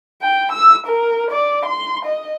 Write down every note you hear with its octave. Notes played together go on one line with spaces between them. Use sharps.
G5
E6
A#4
D5
C6
D#5